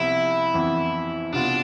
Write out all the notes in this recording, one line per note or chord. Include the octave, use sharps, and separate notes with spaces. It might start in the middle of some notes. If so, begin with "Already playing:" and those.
Already playing: C2 C3 F3 B3 E4 F4
F2 E3 B3
C2 B2 B3 D4 F4